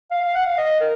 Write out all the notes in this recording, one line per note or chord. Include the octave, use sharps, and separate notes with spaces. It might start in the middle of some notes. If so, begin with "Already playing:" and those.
F5
F5
F#5
F5
D#5
A#4